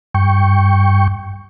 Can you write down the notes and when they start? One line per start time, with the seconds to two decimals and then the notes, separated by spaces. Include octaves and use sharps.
0.15 G2 G5 C#6